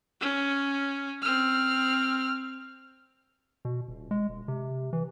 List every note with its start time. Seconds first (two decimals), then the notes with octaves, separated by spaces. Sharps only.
0.21 C#4
1.22 C4 F6
3.65 B2
3.88 D#1
4.11 G#3
4.29 E1
4.48 C3
4.93 E3